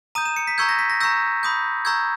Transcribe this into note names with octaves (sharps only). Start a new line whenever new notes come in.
A#5 D#6 G6 D#7
E7
C#7
B6
A#5 C#6 E6 G6 G#6
A#6
B6
A#6
A#5 C#6 E6 G6 A#6
B5 D#6 G6
A#5 C#6 E6 G6 G#6